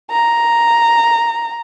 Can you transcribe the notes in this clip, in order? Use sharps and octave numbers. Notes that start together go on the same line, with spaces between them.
A#5